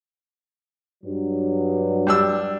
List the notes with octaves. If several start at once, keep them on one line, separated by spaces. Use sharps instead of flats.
G2 F#3
G3 D4 E6